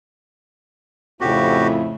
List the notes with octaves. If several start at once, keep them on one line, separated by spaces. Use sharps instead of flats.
F2 A2 C#3 E4 F#4 G4